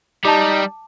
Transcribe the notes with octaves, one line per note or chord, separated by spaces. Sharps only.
G3 D#4 A5 D6